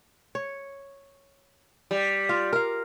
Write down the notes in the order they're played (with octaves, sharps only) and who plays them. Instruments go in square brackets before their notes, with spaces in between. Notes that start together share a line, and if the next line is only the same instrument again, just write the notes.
[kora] C#5
[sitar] G3
[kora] F4
A#4 F5